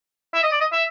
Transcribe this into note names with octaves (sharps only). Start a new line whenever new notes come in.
E5
D#5
D5
D#5
E5